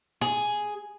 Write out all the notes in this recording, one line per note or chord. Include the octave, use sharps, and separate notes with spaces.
G#4